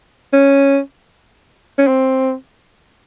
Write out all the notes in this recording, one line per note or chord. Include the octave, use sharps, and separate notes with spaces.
C#4
C#4
C4